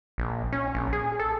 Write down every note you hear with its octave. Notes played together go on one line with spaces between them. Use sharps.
A#1
C#4
A#1
G#4
A4